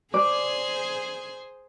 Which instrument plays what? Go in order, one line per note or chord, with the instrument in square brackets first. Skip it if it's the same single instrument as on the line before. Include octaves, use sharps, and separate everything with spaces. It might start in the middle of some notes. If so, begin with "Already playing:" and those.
[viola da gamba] G#4 C5 [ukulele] D5